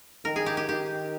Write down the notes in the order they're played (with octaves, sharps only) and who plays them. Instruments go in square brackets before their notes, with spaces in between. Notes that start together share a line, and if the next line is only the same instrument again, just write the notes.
[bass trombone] D#3 [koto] A#4
[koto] G#4
G4
G4
[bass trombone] D#3 [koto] G4